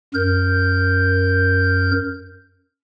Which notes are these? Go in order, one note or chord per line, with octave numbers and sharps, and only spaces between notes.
F#2 A#4 G6